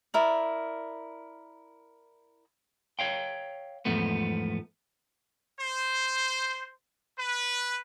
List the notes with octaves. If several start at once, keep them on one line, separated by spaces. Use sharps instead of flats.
E4 A#4 D5
C#5 F5 G5
E2 G#2 F3 A3 B3
C5
B4